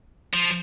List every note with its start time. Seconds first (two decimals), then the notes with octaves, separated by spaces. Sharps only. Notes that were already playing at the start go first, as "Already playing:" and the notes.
0.34 F3